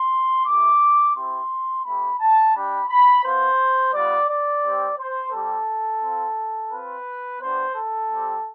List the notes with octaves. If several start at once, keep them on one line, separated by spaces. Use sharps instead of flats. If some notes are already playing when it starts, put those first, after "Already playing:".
Already playing: C6
A3 E4 G4 D6
C4 E4 G4 C6
A3 C4 G4 B5
A5
G3 D4 G4 B5
B5
B3 F4 C5
G3 B3 F4 D5
D5
G3 C4 G4
C5
G3 C4 G4 A4
C4 F4
C4 F4 B4
B3 D4 G4 C5
A4
G3 C4 G4